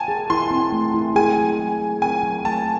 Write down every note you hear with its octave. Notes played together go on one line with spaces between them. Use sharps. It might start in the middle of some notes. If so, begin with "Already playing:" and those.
Already playing: G#5 A5
G#4
E4 C6
C4
A3
E4
G#4 G#5
F#3
F#3
G#4
C4 G#5
F#3
A3 A5